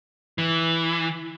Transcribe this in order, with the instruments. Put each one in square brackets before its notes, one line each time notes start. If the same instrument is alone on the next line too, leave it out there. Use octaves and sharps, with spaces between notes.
[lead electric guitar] E3